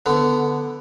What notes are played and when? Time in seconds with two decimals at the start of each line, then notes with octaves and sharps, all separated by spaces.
0.06 D3 B3